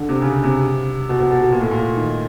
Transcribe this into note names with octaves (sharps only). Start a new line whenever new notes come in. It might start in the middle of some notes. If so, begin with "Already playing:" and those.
Already playing: D3
C3
C#3
C3
B2
B2
B2
B2
A#2
A2
A#2
D#3